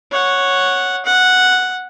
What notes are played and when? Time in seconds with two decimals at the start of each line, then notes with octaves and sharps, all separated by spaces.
0.12 C#5 F#5
1.06 F#5